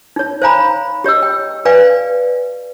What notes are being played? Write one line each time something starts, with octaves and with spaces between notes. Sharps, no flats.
D#4 C#5
C5 C#5 F5 G#5 A#5 B5
G4 C#5 D#5 E6
G5
B4 D5 F5 G5 G#5